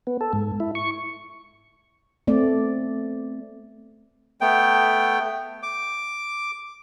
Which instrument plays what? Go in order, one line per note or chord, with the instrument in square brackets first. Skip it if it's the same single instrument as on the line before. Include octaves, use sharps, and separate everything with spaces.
[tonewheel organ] B3
A4
G#2
E4
C#6
[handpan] A3 B3 C4 D5
[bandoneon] A3 B3 G5
D6